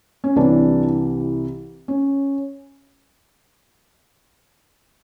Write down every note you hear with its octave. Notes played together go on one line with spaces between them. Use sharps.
C#4
C2 C3 E3 D4
C#4